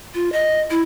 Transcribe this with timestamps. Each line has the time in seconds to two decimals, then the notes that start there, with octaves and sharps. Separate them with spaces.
0.15 F4
0.32 D#5
0.70 E4